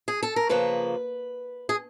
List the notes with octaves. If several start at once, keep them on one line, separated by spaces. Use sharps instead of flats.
G#4
A4
A#4
C#3 F3 A#3 B4
G#4